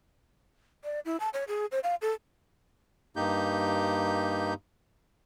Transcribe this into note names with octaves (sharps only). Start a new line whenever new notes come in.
D5
E4
A5
C#5
G#4
C5
F5
A4
G2 A#3 D#4 G4 G6